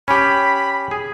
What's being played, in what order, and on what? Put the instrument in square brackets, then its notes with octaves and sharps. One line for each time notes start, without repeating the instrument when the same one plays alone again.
[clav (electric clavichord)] C#4 G4 [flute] B5
[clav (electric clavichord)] G#4